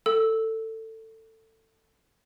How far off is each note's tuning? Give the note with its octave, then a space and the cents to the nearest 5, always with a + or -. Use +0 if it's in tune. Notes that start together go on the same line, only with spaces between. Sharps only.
A4 +20 E6 -10